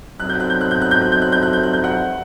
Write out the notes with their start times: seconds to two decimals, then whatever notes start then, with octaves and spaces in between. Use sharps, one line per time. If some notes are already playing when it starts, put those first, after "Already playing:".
0.19 F#3 C4 D#4 F#4 A4 F#6
0.29 G6
0.40 F#6
0.50 G6
0.61 F#6
0.71 G6
0.81 F#6
0.91 G6
1.02 F#6
1.12 G6
1.22 F#6
1.32 G6
1.43 F#6
1.53 G6
1.63 F#6
1.73 G6
1.84 F#5 F#6